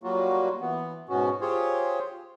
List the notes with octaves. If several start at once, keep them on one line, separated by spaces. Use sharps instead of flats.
F#3 G3 A#3 F4 F#4
E3 B3
G#2 B2 B3 C#4 F#4
F4 G4 G#4 C5 C#5